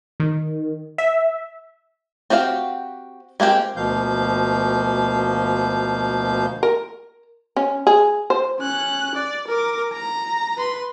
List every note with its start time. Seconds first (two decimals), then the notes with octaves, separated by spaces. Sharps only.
0.20 D#3
0.98 E5
2.30 C4 F#4 G4 F5
3.40 G#3 A#3 C4 G4
3.76 D2 B2 F3 A#3 F5 G6
6.63 A#4
7.57 C#4
7.87 G#4
8.30 C5
8.60 C#4 F#6
9.15 D5
9.48 A#4 D6
9.93 A#5
10.58 B4 C6